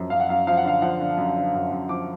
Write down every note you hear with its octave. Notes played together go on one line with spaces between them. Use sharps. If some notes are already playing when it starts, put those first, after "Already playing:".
Already playing: F#2 F3
F#2 F5
F#5
F#2 F5
F3 F5
F#5
D3 F5
F3 F#5
D3
F#2
D3
F#2
F#2
F3 D6